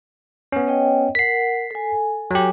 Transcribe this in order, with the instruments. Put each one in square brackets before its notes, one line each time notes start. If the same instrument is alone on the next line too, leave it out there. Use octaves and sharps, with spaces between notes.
[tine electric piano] B3 C#4
[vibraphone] C#5 D#5 G5
[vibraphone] A#4 F#5 [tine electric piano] B6 C7
[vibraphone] A4 G#5
[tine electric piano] F#3 G4